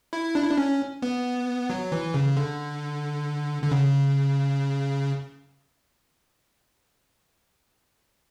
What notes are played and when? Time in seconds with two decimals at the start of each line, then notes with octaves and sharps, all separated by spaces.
0.13 E4
0.35 D4
0.43 E4
0.50 D4
0.57 C#4
1.02 B3
1.70 F#3
1.92 E3
2.14 C#3
2.37 D3
3.63 D3
3.72 C#3